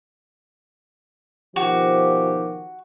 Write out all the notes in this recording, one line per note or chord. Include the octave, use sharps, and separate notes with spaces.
B2 D#3 F3 F#4 G4